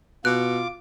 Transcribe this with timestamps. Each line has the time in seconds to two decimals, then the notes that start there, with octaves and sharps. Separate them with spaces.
0.25 B2 F4 D6 F#6